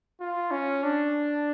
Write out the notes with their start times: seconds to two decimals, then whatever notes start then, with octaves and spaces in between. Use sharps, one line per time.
0.20 F4
0.51 C#4
0.84 D4